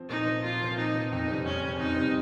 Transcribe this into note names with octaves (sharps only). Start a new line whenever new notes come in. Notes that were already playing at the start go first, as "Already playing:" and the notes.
Already playing: F3 C4
A#2 D#4
F3 C4
A#2 F4
F3 C4
A#2 D#4
F3 C4
F2 D#4
C#3 G3 C4
F2 C#4
C#3 G3 C4
F2 D#4
C#3 G3 C4